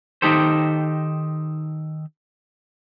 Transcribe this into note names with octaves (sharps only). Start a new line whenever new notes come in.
D#3 D#4 G4 A4 C5